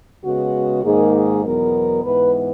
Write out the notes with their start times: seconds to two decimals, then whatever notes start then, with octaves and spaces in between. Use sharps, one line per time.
0.24 C#3 G#3 B3 F#4
0.83 G#2 D#3 A#3 G#4
1.14 G#4
1.43 E2 B2 F#3 B3 A#4
2.04 G#2 E3 B3 B4